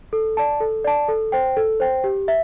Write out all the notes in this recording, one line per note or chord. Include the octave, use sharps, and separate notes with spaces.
A4
D5 A5
A4
D5 A5
A4
C5 G5
A4
C5 G5
G4
E5